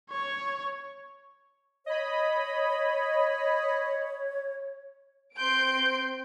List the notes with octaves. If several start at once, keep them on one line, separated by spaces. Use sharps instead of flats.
C#5
C#5 D#5 B5
C4 C6 G6 D7